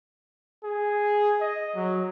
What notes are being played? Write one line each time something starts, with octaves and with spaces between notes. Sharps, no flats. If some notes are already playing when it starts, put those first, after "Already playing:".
G#4
D#5
F#3